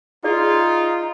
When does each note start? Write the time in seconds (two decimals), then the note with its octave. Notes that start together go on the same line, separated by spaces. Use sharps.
0.24 D#4 F4 G#4 D5